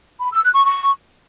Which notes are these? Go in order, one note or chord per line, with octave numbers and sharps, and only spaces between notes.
B5
E6
F#6
C#6
C#6